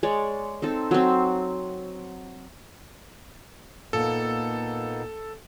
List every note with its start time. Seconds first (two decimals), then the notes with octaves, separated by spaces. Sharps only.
0.03 G#3 C#5 D5
0.62 C4 D#4 A4
0.91 F#3 C4
3.93 A#2 A#3 B3 D#4 A4